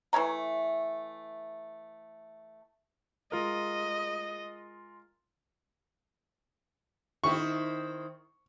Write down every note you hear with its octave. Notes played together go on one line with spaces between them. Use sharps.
E3 A3 C#5 A#5
G#3 F4 A#4 D#5
D#3 C4 E4 C#6